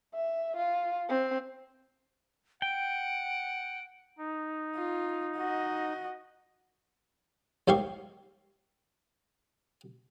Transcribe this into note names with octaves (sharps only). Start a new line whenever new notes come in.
E5
F4
C4
F#5 G5 D7
D#4
F4
F#4 D#5
D#2 G#2 G4 F5 C#6